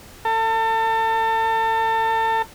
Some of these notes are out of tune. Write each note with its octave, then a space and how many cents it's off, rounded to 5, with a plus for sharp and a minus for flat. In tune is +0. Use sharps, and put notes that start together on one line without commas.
A4 +35